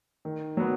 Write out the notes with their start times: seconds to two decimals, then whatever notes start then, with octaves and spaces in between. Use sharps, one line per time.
0.25 D#3
0.57 F#3 B3